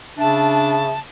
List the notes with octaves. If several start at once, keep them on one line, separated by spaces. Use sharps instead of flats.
C#3 D4 E5 A5